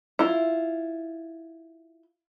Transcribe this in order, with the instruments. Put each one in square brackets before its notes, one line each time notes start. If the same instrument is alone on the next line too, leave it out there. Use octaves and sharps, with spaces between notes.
[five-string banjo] E4 F4